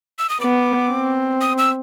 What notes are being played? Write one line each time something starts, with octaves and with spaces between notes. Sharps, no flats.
E6
D#6
B3 D6
C4
D#6
E6